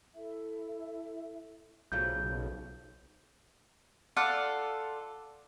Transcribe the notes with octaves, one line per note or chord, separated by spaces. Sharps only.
E4 A4 E5
B1 A#2 C#3 A3 F#4 C5 G6
F4 A4 D5 F#5